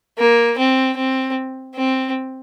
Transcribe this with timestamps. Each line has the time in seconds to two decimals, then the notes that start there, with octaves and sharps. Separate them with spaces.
0.18 A#3
0.58 C4
0.97 C4
1.75 C4